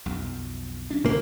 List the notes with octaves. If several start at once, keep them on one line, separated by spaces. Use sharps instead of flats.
B1 F2
C#4 D4
C2 D3 F#3 A#3